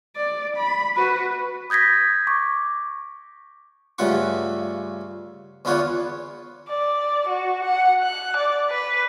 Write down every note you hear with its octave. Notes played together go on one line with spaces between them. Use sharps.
D5
B5
F#4 B4
D#6 G6 G#6 A#6 B6
C#6 D6
G2 C#3 A3 F4 F#5 C#6
E2 D3 B3 F4 C#5 F#5
D5
F#4
F#5
F#6
D5
B4